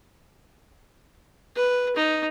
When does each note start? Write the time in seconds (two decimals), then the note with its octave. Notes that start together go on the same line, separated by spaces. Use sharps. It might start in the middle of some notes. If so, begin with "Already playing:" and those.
1.55 B4
1.96 D#4